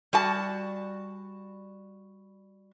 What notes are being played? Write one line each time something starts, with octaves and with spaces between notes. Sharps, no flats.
G3 F#4 A5